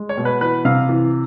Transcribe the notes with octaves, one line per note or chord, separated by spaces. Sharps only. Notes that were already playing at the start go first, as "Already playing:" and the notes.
Already playing: G#3
C#5
B2
B4
E3 B4
C3 F5
E3